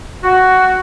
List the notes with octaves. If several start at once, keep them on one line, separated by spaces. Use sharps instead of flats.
F#4